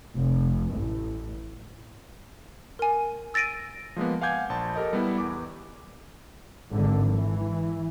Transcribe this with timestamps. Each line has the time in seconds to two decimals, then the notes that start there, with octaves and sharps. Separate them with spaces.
0.13 F1
0.71 A1
2.79 A#4 G#5
3.34 E6 A6 A#6 D7 D#7
3.96 F3 G#3 A#3 B3
4.21 F5 F#5 G#5 D6 G6 G#6
4.50 A#1 A5
4.76 G4 A4 A#4 D#5
4.93 G3 B3 E4
5.18 E2 D6
6.72 G#1 D3
7.11 E3